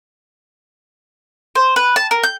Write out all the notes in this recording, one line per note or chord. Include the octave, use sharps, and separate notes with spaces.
C5
B4
A5
A#4
G6